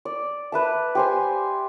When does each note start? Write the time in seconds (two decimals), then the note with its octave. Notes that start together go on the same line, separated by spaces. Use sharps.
0.05 D5
0.52 B4 E5 A5
0.95 G4 C5 G#5